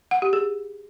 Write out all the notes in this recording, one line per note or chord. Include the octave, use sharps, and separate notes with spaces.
F#5
G4
G#4